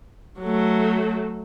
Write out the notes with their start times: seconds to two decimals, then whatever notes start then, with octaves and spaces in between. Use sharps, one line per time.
0.40 F#3 A3